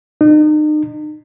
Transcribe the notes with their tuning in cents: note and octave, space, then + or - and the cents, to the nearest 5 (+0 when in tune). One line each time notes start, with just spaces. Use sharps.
D#4 -40